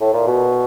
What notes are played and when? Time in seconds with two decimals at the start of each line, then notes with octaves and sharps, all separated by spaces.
0.01 A2
0.13 A#2
0.27 B2